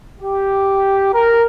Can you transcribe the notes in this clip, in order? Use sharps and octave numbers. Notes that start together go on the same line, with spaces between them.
G4
A#4